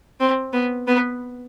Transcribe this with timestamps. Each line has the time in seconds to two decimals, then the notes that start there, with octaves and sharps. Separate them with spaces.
0.20 C4
0.53 B3
0.87 B3